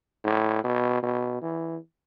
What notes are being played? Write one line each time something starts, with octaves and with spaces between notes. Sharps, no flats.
A2
B2
B2
E3